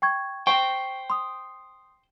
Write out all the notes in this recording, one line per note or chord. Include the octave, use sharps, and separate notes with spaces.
G5 C#6 G#6
C5 G5 C#6
C6 D#6